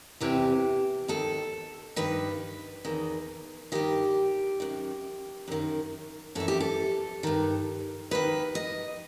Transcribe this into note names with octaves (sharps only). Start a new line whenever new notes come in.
E2 C3 E3 G4
D#2 D#3 A4
G2 D#3 B4
E2 D#3
G2 D#3 G4
F#2 D#3
F#2 D#3
F#2 E3 A4
G4
A4
G2 D#3
D#2 D#3 B4
D#5